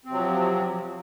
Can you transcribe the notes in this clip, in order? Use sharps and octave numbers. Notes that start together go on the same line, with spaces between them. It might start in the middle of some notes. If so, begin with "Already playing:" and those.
C3 F3 F#3 C4